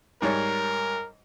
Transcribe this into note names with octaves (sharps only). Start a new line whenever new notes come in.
G#2 G3 A#4 C#5